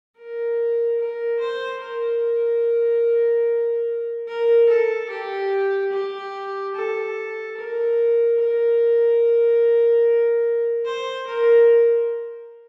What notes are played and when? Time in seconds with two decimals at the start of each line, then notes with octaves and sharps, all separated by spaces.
0.17 A#4
0.99 A#4
1.40 C5
1.81 A#4
4.28 A#4
4.69 A4
5.09 G4
5.92 G4
6.75 A4
7.57 A#4
8.39 A#4
10.85 C5
11.27 A#4